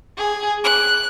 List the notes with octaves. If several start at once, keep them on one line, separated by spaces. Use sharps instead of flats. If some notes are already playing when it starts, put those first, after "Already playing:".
G#4
F#6